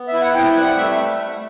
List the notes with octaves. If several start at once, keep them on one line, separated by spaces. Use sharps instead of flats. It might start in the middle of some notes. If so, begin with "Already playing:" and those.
Already playing: B3
E5
E4
F#5
C3 G5
G3 F#5
A3 E5
E5